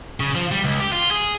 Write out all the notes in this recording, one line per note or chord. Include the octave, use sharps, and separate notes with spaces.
C#3
F3
G3
C#2
G4
F4
G#4